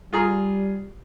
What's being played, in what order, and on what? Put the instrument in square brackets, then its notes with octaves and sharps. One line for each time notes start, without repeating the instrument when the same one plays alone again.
[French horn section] G3 [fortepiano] F4 G#4 A#5